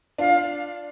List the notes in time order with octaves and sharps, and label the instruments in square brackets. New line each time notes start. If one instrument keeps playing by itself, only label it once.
[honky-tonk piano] D4 F4 [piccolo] F5